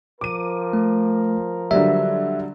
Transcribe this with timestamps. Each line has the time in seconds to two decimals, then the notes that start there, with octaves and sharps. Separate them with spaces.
0.21 F3 A#4 D6 D#7
0.73 A3
1.71 D3 F#3 G3 E5